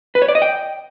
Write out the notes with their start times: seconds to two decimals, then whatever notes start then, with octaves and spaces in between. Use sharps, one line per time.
0.15 B4
0.22 C#5
0.28 D5
0.35 D#5
0.42 G5